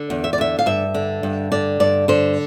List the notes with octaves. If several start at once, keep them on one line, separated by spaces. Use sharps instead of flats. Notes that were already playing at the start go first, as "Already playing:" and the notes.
Already playing: D3
E2
E5
D5
D3 E5
F5
G2 E5
D3
G2
D3 D5
G2 D5
D3 C5